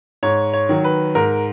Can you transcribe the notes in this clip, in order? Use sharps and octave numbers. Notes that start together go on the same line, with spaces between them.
G#2 C#5
C#5
D#3 F#3
B4
G#2 A#4